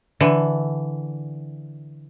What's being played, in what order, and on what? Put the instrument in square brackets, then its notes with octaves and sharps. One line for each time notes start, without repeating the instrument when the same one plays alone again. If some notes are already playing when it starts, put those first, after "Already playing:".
[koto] D3 E3